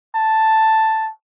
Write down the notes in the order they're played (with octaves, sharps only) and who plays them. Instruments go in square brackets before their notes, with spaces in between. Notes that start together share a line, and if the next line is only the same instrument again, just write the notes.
[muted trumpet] A5